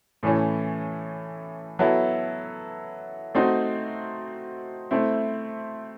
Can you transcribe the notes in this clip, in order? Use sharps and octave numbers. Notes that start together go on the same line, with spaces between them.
A2 E3 A3 C#4
F#3 B3 E4 A4
A3 C4 D#4 F#4
A3 C4 E4